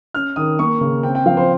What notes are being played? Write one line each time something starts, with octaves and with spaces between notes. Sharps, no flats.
C#4 F6
D#3 D#6
A#3 C#6
C#3
C4 G5
G5
F3 F5
C5